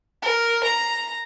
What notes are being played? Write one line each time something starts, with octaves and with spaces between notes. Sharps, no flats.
A#4
A#5